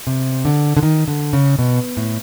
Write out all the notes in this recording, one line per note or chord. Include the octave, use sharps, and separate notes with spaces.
C3
D3
D3
D#3
D3
C#3
B2
A2